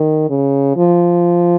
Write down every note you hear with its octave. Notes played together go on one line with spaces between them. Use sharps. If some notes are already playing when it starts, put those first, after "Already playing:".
Already playing: D#3
C#3
F3